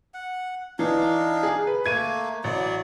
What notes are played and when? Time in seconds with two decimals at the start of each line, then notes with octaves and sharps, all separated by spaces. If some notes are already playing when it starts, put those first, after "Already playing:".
0.14 F#5
0.79 E3 D4 D#4 F5
1.43 G#4
1.67 B4
1.86 A3 A#3 G#6 D#7
2.44 A1 F#3 D5